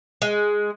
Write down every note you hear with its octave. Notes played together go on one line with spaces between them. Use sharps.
G#3